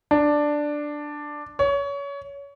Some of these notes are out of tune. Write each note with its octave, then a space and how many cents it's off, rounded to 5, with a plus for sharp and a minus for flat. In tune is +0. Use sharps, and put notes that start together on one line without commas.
D4 +5
C#5 +25